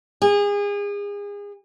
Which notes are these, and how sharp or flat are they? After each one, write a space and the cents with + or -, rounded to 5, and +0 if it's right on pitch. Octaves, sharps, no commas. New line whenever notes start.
G#4 -30